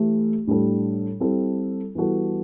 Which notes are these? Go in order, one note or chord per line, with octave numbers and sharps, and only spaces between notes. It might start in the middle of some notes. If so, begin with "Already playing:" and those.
Already playing: E3 A3 E4 G4
A2 G3 D4 A4
G3 C4 E4 A4
E3 G3 B3 F#4 A4